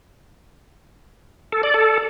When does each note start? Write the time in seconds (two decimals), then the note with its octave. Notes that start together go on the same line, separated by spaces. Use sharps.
1.52 A4
1.63 D5
1.74 A4